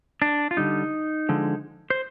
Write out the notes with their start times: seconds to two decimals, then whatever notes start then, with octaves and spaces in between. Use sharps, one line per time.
0.22 D4
0.51 F4
0.57 D3 G3 D#4
1.29 D3 F3 G#3
1.90 C5